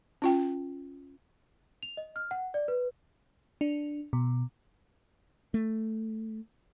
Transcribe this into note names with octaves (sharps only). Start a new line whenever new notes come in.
C#4 F4 G5
F7
D#5
F6
F#5
D5
B4
D4
B2
A3